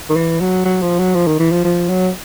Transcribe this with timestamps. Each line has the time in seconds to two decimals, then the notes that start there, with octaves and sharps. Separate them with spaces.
0.10 D#3
0.16 E3
0.40 F#3
0.65 F#3
0.82 F3
0.99 F#3
1.15 F3
1.27 D#3
1.40 E3
1.52 F3
1.64 F3
1.89 F#3